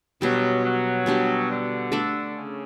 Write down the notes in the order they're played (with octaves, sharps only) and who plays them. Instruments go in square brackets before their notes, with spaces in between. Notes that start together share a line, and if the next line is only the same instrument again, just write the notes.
[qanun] B2 G3 D4 [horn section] F#3
[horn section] F#3
[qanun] B2 G3 D4 G4
[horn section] D3
[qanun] A3 D4 A4 E5
[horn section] C#3